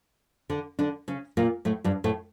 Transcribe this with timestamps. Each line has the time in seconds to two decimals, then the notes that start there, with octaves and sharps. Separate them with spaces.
0.50 D3 D4
0.79 D3 D4
1.08 C#3 C#4
1.37 A#2 A#3
1.65 A2 A3
1.84 G2 G3
2.04 A2 A3